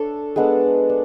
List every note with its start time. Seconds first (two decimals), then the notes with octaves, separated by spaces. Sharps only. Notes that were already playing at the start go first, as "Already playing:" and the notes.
Already playing: D4 A4 C#5
0.36 G#3 B3 D4 A4
0.89 D4